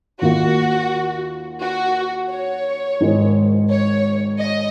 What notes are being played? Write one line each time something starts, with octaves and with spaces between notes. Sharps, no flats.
D#2 D#3 A#3 F4 F#4
F#4
C#5
G#1 G#2 D#3 G#3
C#5
D#5